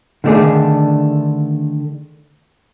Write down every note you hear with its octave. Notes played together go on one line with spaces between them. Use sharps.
D3 D#3 A3 D4 G#4